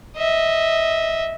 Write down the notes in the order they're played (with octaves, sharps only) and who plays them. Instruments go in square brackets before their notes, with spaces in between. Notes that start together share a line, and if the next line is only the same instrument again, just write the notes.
[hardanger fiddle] D#5 E5